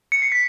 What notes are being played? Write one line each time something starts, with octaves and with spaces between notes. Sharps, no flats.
C#7
C7
B6